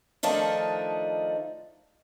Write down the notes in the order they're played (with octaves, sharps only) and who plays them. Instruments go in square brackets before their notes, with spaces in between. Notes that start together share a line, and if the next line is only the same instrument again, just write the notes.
[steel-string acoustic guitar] D#3 F3 A3 D4 D#4